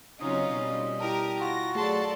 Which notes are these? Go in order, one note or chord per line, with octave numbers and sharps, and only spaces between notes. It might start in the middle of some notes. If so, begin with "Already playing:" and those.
C#3 F#3 C4 C#4 D#4 F4 D#5
B2 G3
E4 G4 A#4 A5 D#6
F4 F#4 A#6
F#3 A3 G#4 A4 D5 A5 C6 A6